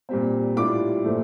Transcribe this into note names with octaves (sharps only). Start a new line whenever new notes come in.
A#2 G3 C4
A2 G3 D4 F4 D6
A#2 F3 A3